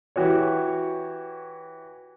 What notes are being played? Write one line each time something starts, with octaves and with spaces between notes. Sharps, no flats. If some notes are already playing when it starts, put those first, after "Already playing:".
E3 F#4 G4 C#5